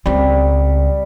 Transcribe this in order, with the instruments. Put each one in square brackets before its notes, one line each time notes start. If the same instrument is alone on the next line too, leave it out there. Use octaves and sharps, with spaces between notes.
[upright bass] C#2 C4 [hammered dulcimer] G3